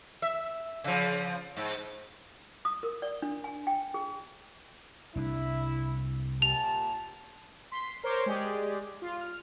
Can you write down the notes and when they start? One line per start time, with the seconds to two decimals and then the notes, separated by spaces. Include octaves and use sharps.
0.22 E5
0.84 C#3 F3
1.57 G#2
2.65 D#6
2.83 A#4
3.02 D5
3.22 D4
3.44 G#5
3.67 G5
3.94 G#4
5.16 C2 G3 D4 E4
6.42 A#2 G4 A5 F7
7.72 C6 B6 C7
8.03 A#4 C5 C#5 C6 D6
8.26 G#3 G4 G#4 D5
9.02 F4
9.21 F6